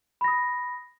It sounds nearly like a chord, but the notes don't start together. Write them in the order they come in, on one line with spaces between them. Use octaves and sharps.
B5 A#6 D#6